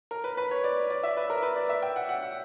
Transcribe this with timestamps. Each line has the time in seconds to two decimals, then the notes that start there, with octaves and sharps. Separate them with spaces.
0.11 A#4
0.24 B4
0.37 B4
0.51 C#5
0.64 D5
0.90 D5
1.03 E5
1.17 B4
1.30 A#4
1.42 B4
1.56 D5
1.69 E5
1.82 G5
1.96 F#5
2.09 F#5
2.23 F#5